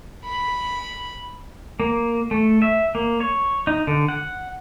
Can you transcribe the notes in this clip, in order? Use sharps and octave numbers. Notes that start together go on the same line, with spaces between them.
B5
A#3
A3
E5
A#3
C#5
D#4
D3
F#5